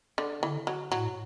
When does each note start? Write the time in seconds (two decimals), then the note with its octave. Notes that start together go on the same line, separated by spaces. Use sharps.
0.18 D3
0.43 D3 E3
0.67 F#3
0.92 A2 F#3